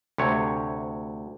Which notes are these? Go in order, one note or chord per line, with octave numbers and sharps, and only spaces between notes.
D2 C3 C#5